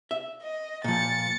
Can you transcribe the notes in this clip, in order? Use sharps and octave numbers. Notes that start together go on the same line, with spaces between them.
E5
D#5
A#2 F3 A6 C#7